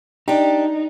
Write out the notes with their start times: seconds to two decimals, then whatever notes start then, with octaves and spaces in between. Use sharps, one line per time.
0.28 D4 D#4 G4